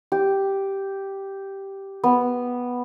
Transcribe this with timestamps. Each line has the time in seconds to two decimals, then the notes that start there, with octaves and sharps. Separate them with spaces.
0.12 G4
2.04 B3